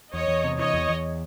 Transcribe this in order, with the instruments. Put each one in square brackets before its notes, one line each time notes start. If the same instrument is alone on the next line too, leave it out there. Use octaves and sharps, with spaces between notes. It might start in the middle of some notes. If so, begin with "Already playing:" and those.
[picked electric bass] E2 [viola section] C#5 D#5
[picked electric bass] E2
C3
[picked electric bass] E3 [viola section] C#5 D#5
[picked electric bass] E2
E2